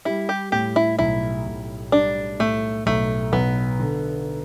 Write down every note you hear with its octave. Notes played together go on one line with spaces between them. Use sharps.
G3 E4
G4
A2 G4
E4
B1 E4
B1
G3 D4
A2 A3
B1 A3
B1 B3
D3